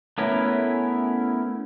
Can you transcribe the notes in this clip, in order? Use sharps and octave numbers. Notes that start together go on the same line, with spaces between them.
A3 B3 C#4 E4 A#4